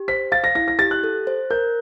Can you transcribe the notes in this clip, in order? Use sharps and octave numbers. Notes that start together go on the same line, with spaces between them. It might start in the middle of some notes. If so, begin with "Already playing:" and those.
Already playing: G4
C5 B6
F5 A6
A#6
E4 A#6
A#6
G4 A6
F#6
A4
C5
A#4 G6